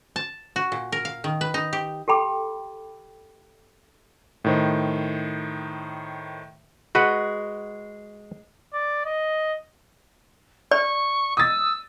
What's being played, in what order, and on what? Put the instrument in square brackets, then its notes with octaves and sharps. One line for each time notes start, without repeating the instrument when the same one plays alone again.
[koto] A5
F#4
A#2
A#4
F5
D#3
B4
D#4
G4
[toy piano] G4 A4 G5 B5 D6
[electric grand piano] A2 D#3 C5
[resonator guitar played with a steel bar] G#3 [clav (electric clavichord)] F#4 B4 F#5
[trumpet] D5
D#5
[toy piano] D5 [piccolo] C#6
[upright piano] D#6 A6 [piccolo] E6